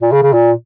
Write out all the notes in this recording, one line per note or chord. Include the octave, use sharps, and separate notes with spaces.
A#2
C#3
C#3
A#2